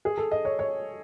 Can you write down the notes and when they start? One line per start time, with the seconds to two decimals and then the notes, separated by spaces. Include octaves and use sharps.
0.05 G#4
0.17 A4
0.31 D#5
0.45 C#5
0.59 C#5